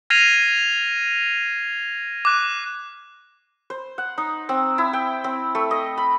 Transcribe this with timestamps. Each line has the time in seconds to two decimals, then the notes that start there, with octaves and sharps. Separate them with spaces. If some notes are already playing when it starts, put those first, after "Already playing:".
0.10 F6 G#6 A#6 C7 D#7 F7
2.25 D6 F#6
3.70 C5
3.98 F#5
4.18 D#4
4.49 C4
4.78 E4
4.93 G5
5.24 C4
5.55 A3
5.71 D#5
5.98 B5